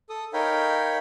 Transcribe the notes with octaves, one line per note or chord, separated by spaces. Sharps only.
A4 D#6
D#4 A#4 C#5 F5 G5 B5